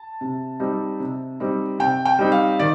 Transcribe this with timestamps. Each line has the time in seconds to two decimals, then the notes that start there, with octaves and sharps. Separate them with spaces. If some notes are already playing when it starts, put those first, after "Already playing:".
Already playing: A5
0.21 C3
0.60 G3 C4 D#4
1.00 C3
1.40 G3 C4 D#4
1.79 C3 G5
2.05 G5
2.19 G3 C4 D#4
2.32 F5
2.59 D#3 D5